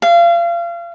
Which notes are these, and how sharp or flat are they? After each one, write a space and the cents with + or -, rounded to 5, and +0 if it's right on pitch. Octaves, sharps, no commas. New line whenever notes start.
F5 -30